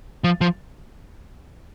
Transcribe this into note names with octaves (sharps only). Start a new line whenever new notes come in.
F3
F3